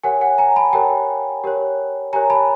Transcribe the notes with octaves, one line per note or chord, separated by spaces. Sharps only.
G4 A#4 C#5 F#5 G#5
F#5 G#5
G#5 A#5
A5 B5
G4 A#4 C#5 G5 A5
G4 A#4 C#5
G4 A#4 C#5 G#5 A#5
A5 B5